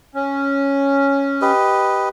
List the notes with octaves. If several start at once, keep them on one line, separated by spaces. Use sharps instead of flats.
C#4
G4 B4 D#5